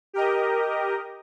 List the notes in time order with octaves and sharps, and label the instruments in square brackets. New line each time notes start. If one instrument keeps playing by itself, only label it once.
[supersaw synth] G4 A#4 D#5